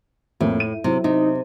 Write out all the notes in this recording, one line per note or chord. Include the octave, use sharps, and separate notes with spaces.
F2 A2 A#3
D#7
C3 F#3 E4
C3 D#4